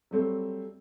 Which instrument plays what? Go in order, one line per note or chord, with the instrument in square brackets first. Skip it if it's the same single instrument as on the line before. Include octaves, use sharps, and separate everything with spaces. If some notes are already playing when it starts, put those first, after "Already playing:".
[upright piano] F#3 G3 A3 C4